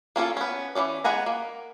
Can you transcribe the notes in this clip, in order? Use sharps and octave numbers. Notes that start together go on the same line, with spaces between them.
A#3 C#4 F4 A4
B3 C#4
E3 F3 C#4 D5
G#3 B3 F#5 G#5 A#5
A#3